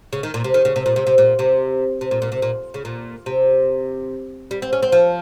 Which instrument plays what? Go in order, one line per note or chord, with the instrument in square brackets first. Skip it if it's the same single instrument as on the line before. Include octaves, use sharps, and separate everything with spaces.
[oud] C#3
D#3
A#2
C3
D#3
C#3
C3
A#2
C3
C3
A#2
C3
C3
A#2
A#2
C3
A#2
C#3
A#2
C3
G3
C4
C#4
C4
F3